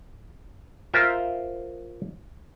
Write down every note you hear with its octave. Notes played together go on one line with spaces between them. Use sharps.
F4 A#4 C5 E5